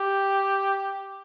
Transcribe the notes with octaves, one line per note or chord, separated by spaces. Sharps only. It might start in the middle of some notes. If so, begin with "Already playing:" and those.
Already playing: G4